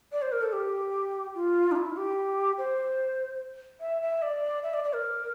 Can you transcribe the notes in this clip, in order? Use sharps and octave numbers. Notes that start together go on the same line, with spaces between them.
D5
C5
A#4
A4
G4
F4
D4
E4
G4
C5
E5
E5
D5
E5
D5
D5
A#4